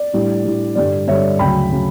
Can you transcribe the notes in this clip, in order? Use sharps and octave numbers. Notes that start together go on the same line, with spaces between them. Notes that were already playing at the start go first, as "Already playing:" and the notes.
Already playing: D5
A2 G3 D4
A2 G3 D4
G2 D3 G3 D5
G2 D3 G3 C#5 E5
D2 C#3 F#3 G5 B5
C#3 F#3